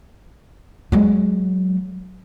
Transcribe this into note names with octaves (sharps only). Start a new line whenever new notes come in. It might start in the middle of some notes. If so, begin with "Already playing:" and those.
F#3 G#3